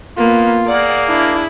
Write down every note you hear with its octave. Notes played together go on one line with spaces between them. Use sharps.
A#3 B3 F4
A#3 G#4 D5 F#5
D4 E4